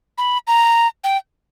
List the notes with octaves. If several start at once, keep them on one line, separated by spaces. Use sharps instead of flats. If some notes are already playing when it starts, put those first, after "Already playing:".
B5
A#5
G5